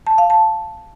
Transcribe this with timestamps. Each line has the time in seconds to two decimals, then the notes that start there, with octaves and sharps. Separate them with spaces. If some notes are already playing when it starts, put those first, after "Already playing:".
0.07 A5
0.18 F5
0.30 A5